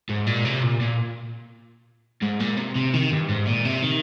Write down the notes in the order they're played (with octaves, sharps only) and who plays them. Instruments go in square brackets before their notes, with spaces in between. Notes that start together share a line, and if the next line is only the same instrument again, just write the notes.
[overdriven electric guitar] G#2
A#2
C3
A#2
A#2
G#2
A#2
C3
C3
D#3
G2
G#2
A#2
C3
D#3